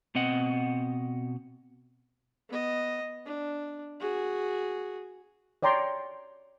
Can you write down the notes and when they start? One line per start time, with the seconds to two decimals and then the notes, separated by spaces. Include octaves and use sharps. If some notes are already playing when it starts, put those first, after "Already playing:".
0.15 B2 C4 D#5 F#5
2.49 B3 D#5
3.26 D4
4.00 F#4 G#4
5.63 C#5 D5 G5 A#5 C6